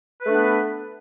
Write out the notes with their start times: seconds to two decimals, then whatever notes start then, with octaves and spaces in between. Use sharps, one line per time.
0.21 B4
0.25 A3
0.29 D4
0.33 B3